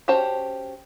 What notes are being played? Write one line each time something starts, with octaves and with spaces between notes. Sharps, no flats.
C#4 F#4 G4 C5 A5